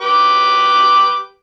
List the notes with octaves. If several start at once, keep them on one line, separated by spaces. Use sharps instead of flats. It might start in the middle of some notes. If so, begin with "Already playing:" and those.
G4 B4 D6